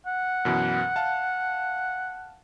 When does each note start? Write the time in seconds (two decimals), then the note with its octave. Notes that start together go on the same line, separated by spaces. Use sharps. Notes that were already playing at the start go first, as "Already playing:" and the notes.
0.06 F#5
0.45 F#2 B2 E3
0.96 F5 A5